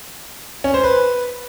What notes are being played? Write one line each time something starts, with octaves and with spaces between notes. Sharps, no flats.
C#4
C5
B4